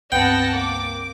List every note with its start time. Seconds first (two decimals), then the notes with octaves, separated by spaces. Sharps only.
0.12 C#2 G2 B3 C4 F#5 G5 A5 A#6
0.53 A#3 D6